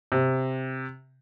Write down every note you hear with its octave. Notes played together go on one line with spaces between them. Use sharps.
C3